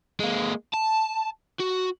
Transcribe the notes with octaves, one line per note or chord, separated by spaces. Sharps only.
G#3 A#3
A5
F#4